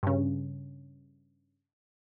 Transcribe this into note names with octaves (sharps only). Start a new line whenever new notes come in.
G2 C#3